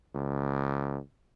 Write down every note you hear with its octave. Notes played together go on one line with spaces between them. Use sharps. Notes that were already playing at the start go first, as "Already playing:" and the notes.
C#2